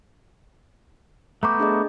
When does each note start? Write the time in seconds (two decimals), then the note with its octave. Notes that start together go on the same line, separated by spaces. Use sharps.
1.43 A3 B3 A#5 C#6 D6 G6
1.60 D4 G#4 D#5